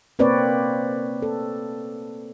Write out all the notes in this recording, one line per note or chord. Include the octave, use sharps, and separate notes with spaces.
A#3 C4 B4 C#5 D5
A4